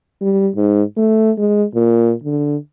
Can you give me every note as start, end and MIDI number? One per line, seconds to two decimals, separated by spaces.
0.21 0.50 55
0.56 0.83 44
0.97 1.31 57
1.38 1.64 56
1.75 2.14 46
2.24 2.56 50